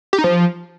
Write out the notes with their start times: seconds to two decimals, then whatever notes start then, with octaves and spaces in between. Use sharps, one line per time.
0.13 G4
0.18 D#4
0.24 F3